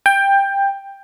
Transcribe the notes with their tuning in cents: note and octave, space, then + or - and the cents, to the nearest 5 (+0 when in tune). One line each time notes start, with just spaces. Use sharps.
G5 +15